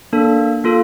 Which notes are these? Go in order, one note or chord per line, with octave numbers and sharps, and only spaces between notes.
A#3 D4 A4
A#3 F4 A4